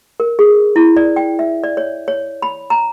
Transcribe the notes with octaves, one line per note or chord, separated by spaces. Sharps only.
A#4
G#4
E4
D5
G5
E5
D5
C#5
C#5
B5
A#5